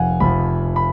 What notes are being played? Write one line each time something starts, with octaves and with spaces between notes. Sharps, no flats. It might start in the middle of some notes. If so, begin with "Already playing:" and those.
Already playing: F1 F2 F3 F5 F#5 G#5
F1 F2 F3 B5
B5